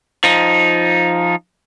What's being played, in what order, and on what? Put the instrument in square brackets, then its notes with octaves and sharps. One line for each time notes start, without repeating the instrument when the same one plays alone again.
[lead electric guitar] F3 D#4